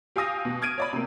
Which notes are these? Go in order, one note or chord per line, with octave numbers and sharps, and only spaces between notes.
G4 F5 G#5 D#6 A#6 D#7
B2
F6 G#6 D7 D#7
C#5 D5 B5
C3 A#3